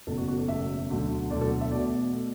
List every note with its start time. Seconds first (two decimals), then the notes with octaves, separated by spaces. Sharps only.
0.07 F#1 E2 B2 A3 A4
0.18 F#4
0.28 F#4
0.38 A4
0.48 F#1 E2 B2 A3 E5
0.90 E1 D2 D3 F#3 A3
1.30 E1 D2 D3 F#3 A3 D5
1.41 A4
1.61 E5
1.71 E2 B2 A3 D5
2.13 B2 A3